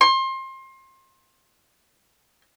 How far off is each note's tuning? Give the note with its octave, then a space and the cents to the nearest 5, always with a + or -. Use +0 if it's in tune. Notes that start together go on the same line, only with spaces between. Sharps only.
C6 +30